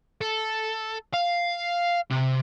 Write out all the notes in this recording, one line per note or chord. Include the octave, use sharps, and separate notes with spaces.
A4
F5
C3